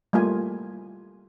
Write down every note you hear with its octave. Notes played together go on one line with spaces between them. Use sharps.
G3 A3 A#3 F4 G#5